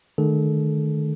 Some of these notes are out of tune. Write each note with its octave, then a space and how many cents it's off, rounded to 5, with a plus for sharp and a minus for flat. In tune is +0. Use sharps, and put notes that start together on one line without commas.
D#3 -35 A3 -20 A4 -40